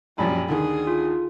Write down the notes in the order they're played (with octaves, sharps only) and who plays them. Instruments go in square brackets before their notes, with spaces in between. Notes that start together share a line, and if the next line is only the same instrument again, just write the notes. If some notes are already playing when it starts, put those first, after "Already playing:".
[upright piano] A#1 F#2 F3 [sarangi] G3 [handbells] G#5 B5
[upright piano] D2 D3 D#3 [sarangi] G#4
[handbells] F4